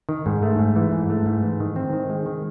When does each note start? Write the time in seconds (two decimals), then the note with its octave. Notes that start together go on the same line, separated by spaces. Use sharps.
0.09 D#3
0.26 G#2
0.43 A3
0.59 G#2
0.76 E3
0.92 G#2
1.10 A3
1.26 G#2
1.43 E3
1.60 D#3
1.76 C4
1.93 D#3
2.10 G#3
2.26 D#3